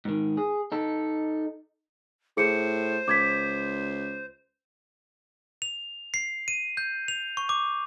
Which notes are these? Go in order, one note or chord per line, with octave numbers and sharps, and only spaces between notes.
G#2 D#3
G#4
D#4 A4
A2 G#4 C5 C#7
C#2 D6 G#6 B6
F7
C7
D#7
G6
F7
C#6
D6